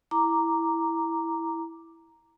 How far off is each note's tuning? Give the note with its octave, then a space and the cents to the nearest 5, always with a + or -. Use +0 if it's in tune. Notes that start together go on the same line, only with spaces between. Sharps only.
E4 +0 A#5 +0 D6 +0